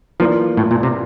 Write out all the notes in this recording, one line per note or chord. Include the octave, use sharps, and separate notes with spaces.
E3 F3 A#3 F4 A#4 D5
A2
A#2
C3